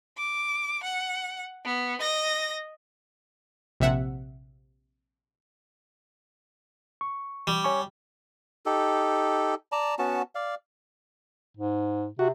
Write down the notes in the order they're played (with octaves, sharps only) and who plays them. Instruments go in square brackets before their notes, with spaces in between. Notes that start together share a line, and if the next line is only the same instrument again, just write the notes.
[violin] D6
F#5
B3
D#5 A#6
[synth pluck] A#1 C3 E5 F#5
[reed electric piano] C#6
[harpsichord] G3
[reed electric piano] C#5 G#5 C#6
[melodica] D#4 G4 A4
D5 A5 A#5
B3 C#4 F#4 A5
D5 F5
[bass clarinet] G#2
[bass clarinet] C3 [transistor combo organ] F#4